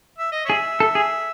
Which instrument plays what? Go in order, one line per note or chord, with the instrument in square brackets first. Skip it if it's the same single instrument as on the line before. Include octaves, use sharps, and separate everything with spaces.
[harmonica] E5
D#5
[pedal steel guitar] G#4 [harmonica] C#5 E5
[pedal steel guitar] A4
G#4